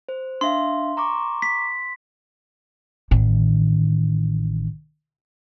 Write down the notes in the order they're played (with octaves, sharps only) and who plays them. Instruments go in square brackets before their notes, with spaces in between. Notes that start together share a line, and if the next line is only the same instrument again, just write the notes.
[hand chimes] C5
[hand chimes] D4 E5 F5 [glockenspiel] C6
[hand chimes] A#5 C#6 D6
[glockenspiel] B6
[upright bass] A1 D#3